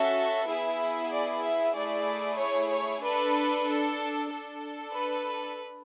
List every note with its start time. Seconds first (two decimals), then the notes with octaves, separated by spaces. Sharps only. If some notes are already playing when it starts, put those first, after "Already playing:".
Already playing: C#4 F#4 A4 E5
0.46 B3 E4 G#4 E5
1.11 D5
1.42 E5
1.75 A3 E4 G#4 D5
2.37 C#5
2.70 C#5
3.01 D4 A4 B4
3.65 A4
4.29 D4 A4
4.93 B4